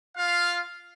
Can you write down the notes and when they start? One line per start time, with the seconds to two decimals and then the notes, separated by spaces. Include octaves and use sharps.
0.17 F4 F5